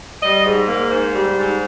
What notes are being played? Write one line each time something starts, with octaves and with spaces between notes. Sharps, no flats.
G3 D#5
G#2
A#3
G#2 C5
G3
G#2